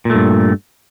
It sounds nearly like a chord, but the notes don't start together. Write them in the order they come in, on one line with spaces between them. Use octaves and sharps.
A#2 A3 G2